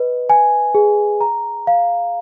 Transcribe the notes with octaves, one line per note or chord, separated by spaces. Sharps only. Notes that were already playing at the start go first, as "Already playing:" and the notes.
Already playing: B4 D#5
G#5
G#4
A#5
F5